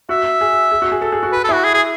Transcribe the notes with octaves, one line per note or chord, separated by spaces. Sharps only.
F#4 E5
G#4
G#4
F#4
G#4
A4
G#4
F#4
B4
A4
E4 F#4
G#4
G#4